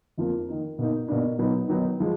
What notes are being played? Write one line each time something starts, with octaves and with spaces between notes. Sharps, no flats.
F2 F3 A#3
D#3 A#3 D#4
B2 A#3 D#4
B2 A#3 D4
B2 F#3 B3 D#4
D#3 F#3 B3 D#4
F3 G#3